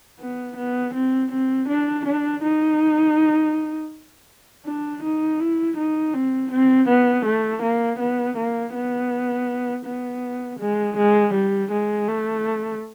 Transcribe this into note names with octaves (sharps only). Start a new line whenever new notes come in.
B3
B3
C4
C4
D4
D4
D#4
D4
D#4
E4
D#4
C4
C4
B3
A3
A#3
B3
A#3
B3
B3
G#3
G#3
G3
G#3
A3